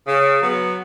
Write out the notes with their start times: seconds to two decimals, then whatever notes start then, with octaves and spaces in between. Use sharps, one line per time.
0.06 C#3
0.41 F#3 B3